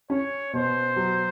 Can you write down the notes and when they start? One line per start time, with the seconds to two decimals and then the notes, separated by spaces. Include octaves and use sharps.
0.10 C#4 C#5
0.53 B2 C5
0.96 F#3